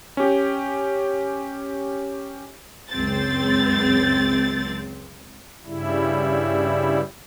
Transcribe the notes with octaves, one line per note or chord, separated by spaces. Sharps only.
C#4 G4
C#2 F#2 C4 A6
G2 C#3 G3 E4